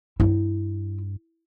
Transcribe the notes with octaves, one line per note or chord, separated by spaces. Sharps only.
G2 E4